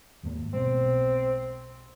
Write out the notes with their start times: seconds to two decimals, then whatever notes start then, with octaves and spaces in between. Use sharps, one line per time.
0.23 D#2 G#2 A#3
0.53 B1 B2 G#3 C4